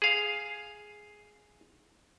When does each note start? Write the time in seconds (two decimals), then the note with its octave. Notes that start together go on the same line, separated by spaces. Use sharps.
0.02 G#4 F5